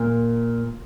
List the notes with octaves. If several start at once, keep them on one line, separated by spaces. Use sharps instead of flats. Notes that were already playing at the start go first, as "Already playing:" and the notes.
Already playing: A#2